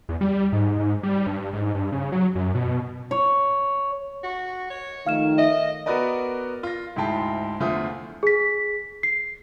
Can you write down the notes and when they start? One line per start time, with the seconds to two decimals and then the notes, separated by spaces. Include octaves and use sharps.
0.09 E2
0.21 G3
0.52 G#2
0.80 G#2
1.03 G3
1.27 G2
1.53 G#2
1.75 G2
1.92 C#3
2.12 F#3
2.35 F#2
2.55 B2
3.11 C#5
4.23 F#4
4.70 C#5
5.07 D#3 F3 A3 F5 F6 E7
5.38 D#5 E5
5.86 B3 F#4 A#4 B4 D5 D#5
6.63 F4 A#6
6.96 D2 G#2 E4 G5 A5 C7
7.60 E2 D3 A3 F4 C5 D#6
8.23 G#4 B6
9.03 C7